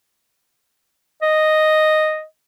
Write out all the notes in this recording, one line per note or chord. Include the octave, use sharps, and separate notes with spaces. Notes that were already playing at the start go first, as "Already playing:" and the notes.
D#5